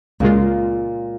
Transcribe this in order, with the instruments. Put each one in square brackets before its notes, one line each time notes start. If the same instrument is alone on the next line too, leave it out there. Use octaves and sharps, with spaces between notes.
[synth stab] C#2 C#3 G#3 F4 [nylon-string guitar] A#2